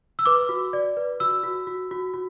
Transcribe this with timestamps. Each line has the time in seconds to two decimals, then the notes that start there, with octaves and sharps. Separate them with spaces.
0.19 E6
0.26 B4 D6
0.49 F#4
0.73 D5
0.97 B4
1.20 F#4 E6
1.43 F#4
1.67 F#4
1.91 F#4
2.14 F#4